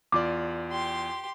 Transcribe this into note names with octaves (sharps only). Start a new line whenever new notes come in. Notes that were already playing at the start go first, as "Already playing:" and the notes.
E2 F4 D5 D6
G4 C6